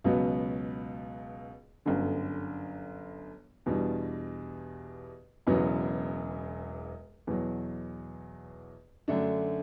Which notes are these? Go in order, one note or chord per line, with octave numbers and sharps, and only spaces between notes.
C#2 B2 F#3 B3
G1 F#2 D3
E2 B2 G3 D4
E1 E2 C#3 F#3 B3
E2 B2 F#3
F#2 D3 A3 D4